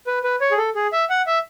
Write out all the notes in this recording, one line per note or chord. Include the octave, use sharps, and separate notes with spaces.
B4
B4
C#5
G#4
A4
G#4
E5
F#5
E5